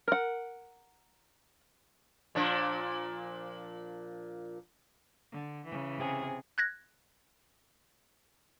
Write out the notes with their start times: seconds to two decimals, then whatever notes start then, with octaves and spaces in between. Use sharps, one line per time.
0.08 A#4 F#5
2.35 A#2 F3 D4
5.32 D3
5.66 C#3 E3
5.98 C3 G#4
6.58 F#6 G#6 A#6